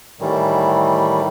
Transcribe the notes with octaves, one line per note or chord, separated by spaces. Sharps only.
A2 D#3 E3 G3